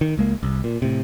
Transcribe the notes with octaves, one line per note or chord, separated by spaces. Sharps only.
D#3
C#2 G#3 A#3
C2
A#2
A2 C3